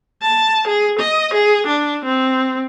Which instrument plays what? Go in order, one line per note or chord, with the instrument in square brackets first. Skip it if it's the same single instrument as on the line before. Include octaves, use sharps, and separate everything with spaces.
[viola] A5
G#4
D#5
G#4
D4
C4